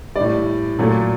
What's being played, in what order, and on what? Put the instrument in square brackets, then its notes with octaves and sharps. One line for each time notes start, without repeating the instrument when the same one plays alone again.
[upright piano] G3 D5
A2
A#2 F#3 A3